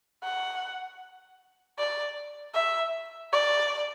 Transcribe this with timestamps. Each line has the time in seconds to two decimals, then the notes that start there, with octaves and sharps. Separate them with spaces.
0.24 F#5
1.79 D5
2.55 E5
3.33 D5